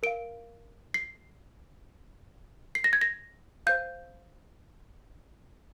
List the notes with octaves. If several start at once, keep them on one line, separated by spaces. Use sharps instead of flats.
A#4 F5 D7
C7
C7
A#6
G#6
A#6
C5 F5 G6